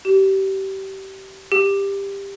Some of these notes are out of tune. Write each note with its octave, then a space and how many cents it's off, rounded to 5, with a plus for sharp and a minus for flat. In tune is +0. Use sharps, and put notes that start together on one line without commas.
G4 -25
G4 +15